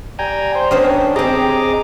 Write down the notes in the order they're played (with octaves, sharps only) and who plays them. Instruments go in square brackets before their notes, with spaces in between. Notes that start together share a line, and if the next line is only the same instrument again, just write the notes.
[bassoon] G3 [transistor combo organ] G5 G#5 A#5
[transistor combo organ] C5
[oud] D#3 B3 C5 [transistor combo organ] C#4 D4
[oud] C4 G4 [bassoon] G#4 [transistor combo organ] D#5 A#5 D6